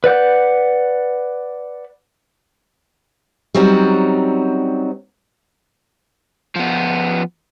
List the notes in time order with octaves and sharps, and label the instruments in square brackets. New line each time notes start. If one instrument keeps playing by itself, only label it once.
[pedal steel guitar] B4 D5 F#5 G6
[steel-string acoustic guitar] F#3 G3 C4 C#4 D#4 F#4
[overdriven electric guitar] F3 B3